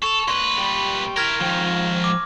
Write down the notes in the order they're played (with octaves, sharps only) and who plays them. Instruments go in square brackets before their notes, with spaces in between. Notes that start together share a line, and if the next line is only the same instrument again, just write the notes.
[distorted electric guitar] A4 [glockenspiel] C#6 F7
[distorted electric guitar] A#2 B4 [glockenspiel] C6
[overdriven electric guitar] G4 D5
[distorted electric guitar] E4 A#4 [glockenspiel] F6 G#6 A#6
[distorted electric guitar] G#2 D#3 [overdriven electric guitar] F3 G5
[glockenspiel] D6